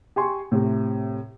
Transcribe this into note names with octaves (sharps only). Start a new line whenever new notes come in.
G4 G#5 C6 C#6
A2 C3